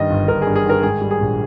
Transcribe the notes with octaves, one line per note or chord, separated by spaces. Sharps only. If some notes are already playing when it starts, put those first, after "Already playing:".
Already playing: G2 D#3 D#5
G1
G1 A#4
G2 G#4
G#4
D#3 A#4
G#2 G#4
G3
G#4
A#1